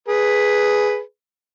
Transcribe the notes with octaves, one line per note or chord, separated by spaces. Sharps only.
G#4 B4